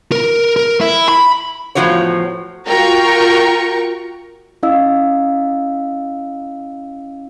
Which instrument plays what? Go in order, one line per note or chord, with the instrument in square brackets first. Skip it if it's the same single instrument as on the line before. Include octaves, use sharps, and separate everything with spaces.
[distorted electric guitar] A#4
A#4
E4
B5
[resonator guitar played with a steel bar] E2 A2 C3 F3 F#4 C#5
[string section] F4 F#4 A#4 G5 A#5 C#6
[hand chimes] C#4 E4 D#5 F5 E6